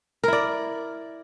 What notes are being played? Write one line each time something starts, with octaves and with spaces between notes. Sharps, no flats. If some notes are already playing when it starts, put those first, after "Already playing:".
E4 A#4 D5